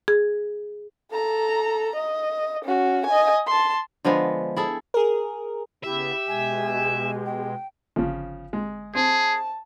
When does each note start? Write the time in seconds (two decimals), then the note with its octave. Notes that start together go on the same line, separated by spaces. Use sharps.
0.08 G#4
1.11 A4 A#5
1.95 D#5
2.64 C#4 F#4
3.06 D#5 G#5
3.47 A5 C6
4.05 D3 F3 G#3 B3
4.56 E4 G#4 A4
4.94 G#4 A#4
5.84 C#3 B3 E4 G4 E5
6.28 B2 G#3 G#5
7.25 G5
7.96 G1 C#3 F3
8.53 G#3
8.95 C4 G#4 A5